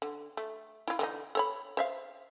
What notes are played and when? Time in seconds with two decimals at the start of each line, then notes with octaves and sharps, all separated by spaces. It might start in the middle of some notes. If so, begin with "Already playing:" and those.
0.02 D3
0.37 A3
0.88 E4 F4
0.99 D3 E3 D#4
1.35 A4 C#5 B5
1.77 C5 E5 F5